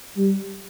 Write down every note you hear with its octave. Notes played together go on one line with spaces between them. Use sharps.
G3